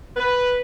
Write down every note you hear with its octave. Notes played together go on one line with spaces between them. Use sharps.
B4